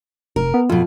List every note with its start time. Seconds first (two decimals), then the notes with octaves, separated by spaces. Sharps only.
0.36 F1 A#4
0.54 B3
0.69 F2 B2 F4